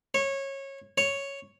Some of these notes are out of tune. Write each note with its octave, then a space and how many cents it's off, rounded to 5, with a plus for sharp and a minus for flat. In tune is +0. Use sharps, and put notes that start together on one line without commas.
C#5 -20
C#5 +0